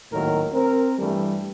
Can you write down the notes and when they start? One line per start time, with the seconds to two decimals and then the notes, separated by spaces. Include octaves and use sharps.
0.12 G#1 D#2 A2 D#3 F#3 A#4
0.53 C4 A#4
0.99 G2 E3 G3 A3